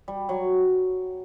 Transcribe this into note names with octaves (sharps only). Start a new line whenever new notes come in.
G3
F#3